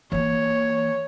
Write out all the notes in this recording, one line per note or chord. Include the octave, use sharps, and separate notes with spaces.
E3 A#3 C#5